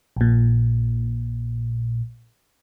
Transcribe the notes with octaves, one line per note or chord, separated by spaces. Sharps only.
A#1 A#2